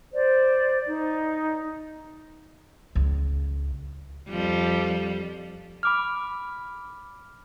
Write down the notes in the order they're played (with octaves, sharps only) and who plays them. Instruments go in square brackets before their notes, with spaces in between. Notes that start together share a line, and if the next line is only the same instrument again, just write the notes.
[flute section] C5 D5
D#4
[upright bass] C#2
[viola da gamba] F2 F3 G3
[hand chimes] B5 D6 F6